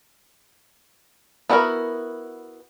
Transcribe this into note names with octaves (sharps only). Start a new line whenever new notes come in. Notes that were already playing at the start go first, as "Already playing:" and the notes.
B3 D4 E4 F#4 A#4